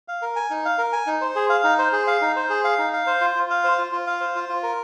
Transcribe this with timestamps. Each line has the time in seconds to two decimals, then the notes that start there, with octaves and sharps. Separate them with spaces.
0.08 F5
0.22 A#4
0.36 G#5
0.50 D#4
0.65 F5
0.78 A#4
0.92 G#5
1.07 D#4
1.21 C5
1.36 G#4
1.49 F5
1.64 D#4
1.78 C5
1.92 G#4
2.07 F5
2.21 D#4
2.36 C5
2.50 G#4
2.64 F5
2.78 D#4
2.93 F5
3.07 C5
3.21 F4
3.35 F4
3.50 F5
3.64 C5
3.78 F4
3.92 F4
4.07 F5
4.20 C5
4.35 F4
4.49 F4
4.63 A#4